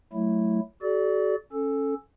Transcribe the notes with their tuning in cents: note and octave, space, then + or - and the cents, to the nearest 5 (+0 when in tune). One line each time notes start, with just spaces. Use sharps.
F#3 +5 A3 +0 E4 +0
F#4 +30 A4 -45 D5 -10
C#4 -10 A4 +0